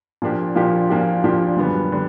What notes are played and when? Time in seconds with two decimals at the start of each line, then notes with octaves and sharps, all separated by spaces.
0.22 A#2 F3 A#3 D4 G4
0.55 A#2 F3 A#3 D4 G4
0.89 A#2 F3 A#3 D4 G4
1.24 A#2 F3 A#3 D4 G4
1.57 F#2 D3 G3 B3
1.92 D3 G3